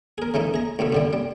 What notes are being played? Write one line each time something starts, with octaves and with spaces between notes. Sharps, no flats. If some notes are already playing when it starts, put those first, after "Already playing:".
G#4 A#4
C#3 E3 A3 D#4
G#4 A#5
C2 G2 B2 A3
F#2 D3 G3
G3